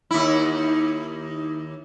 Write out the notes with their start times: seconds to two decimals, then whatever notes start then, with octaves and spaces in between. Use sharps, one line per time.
0.11 D#2 E4